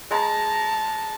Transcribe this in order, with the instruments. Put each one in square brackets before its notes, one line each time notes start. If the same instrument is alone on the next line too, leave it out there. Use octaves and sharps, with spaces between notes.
[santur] G#3 A#5 [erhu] A5